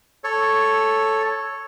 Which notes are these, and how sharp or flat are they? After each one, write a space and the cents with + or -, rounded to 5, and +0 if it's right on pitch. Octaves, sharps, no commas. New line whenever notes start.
A4 +0 C#5 +0